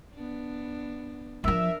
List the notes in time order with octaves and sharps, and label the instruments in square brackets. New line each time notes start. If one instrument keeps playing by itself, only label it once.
[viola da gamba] B3 D4
[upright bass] F3 F#3 [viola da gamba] D4 A#4 [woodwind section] E5